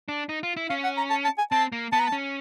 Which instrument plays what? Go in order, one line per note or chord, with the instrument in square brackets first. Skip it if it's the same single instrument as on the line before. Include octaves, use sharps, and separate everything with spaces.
[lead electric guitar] D4
D#4
F4
E4
[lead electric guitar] C#4 [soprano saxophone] F5
[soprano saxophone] F#5
A#5
A5
A5
G#5
[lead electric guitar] C4 [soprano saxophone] A5
[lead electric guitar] A#3
[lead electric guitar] B3 [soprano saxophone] A5
[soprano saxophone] A#5
A5
[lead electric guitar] C#4